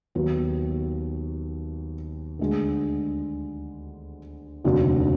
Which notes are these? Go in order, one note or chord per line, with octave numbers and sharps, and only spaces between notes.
D#2 D#3 F#3 B3
D2 D3 G#3
F1 D#2 D3 F#3 D4